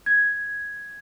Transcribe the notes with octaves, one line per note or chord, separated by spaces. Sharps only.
G#6